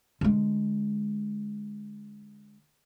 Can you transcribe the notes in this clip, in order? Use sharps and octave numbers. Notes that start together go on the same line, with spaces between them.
D3 G#3